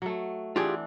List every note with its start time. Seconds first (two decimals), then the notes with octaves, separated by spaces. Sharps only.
0.02 F#3 A3
0.56 E3 C4 D4 F4 G4 G#4